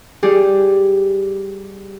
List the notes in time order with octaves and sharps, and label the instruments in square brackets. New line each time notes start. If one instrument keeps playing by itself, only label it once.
[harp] G3 G4 G#4